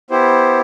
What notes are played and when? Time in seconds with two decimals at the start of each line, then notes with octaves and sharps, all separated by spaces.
0.10 B3 E4 G4 C5